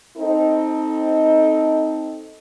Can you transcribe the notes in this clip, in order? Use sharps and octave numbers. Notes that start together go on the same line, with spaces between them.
C4 D#4 A4